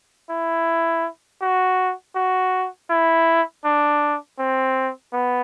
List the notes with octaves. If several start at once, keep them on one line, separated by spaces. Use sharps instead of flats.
E4
F#4
F#4
E4
D4
C4
B3